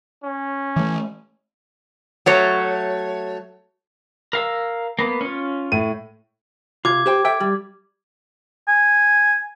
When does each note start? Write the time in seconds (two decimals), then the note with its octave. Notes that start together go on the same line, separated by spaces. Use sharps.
0.24 C#4
0.76 E3 A3
2.26 F#3 A3 C#5
4.33 A#4 F5 E6
4.99 A#3 B3
5.21 C#4 F4
5.72 A2 D#7
6.85 C3 F4 D6 G#6
7.06 G4 C5 G5
7.25 A4 E5 G5
7.40 G3
8.68 G#5